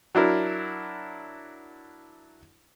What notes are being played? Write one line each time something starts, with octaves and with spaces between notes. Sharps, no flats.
F#3 D4 E4 A#4